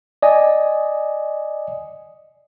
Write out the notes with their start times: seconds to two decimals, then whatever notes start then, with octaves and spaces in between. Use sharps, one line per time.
0.22 D5 D#5 G#5